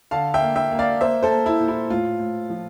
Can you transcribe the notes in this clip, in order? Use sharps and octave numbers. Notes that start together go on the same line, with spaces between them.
D3 F5 A5
E5 G5
A#3
E5 G5
A#3
D5 F5
A#3 C5 E5
A4 C5
A#3
E4
A#2
E4
A2 F4
A2
F3